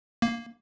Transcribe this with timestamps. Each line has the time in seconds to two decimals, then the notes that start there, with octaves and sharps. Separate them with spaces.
0.22 A#3